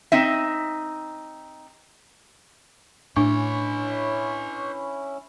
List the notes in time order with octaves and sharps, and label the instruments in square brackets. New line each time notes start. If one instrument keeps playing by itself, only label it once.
[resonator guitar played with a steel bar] C4 D#4 E5
[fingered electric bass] A2 [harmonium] C#4 E4 [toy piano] D4 G#5 C#6 [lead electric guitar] B4 C#5